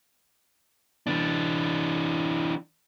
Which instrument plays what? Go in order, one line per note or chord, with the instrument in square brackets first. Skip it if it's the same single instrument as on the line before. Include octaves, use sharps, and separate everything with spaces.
[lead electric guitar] E3 D4